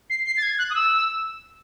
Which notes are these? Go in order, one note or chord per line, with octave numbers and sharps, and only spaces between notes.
C7
C7
A6
G#6
F#6
D#6
E6